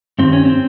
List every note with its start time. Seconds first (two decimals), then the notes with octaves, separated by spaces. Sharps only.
0.19 G2 D#3 C4
0.33 C#4
0.45 C4